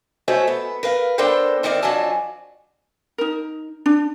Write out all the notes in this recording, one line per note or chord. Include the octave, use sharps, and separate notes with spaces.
G#3 A3 F#4 C5 C#5 E5
B3
A#4 B4 F5
B3 D4 A4 A#4 C5 G5
G#2 D#3 C4 A#4 D5 E5
F2 F#3 D4 F#4 G#5 A5
D#4 A#4
D4